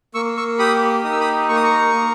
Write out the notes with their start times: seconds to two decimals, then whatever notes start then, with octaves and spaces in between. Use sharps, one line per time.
0.14 A#3 C#6 E6
0.37 C#6 E6
0.59 G4 B5 D#6
1.04 D#4 D#6
1.12 E6
1.20 B5 D#6
1.49 A#3 C#6
1.56 D#6
1.63 A#5 C#6
1.94 A#3